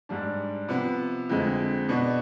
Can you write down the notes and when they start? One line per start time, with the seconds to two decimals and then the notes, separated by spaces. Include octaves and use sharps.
0.09 G#2 G3 D4
0.68 C3 F3 B3
1.29 F2 D3 G#3 C4
1.89 B2 B3 D4